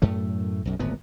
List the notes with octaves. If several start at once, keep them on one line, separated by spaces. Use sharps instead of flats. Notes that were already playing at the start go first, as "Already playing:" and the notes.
F#2 A2 A3
B1 F#2
D1 G#1 A#2 B3